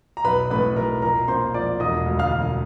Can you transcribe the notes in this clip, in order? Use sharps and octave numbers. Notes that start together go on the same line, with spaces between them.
A#5
B1 B4 B5
A2 B4 B5
B1 A#4 A#5
A#2 A#4 A#5
A#3 C5 C6
F3 D5 D6
E1 D#5 D#6
D2
F5 F6
E1